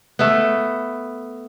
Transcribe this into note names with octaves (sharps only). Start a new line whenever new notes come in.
A3 B3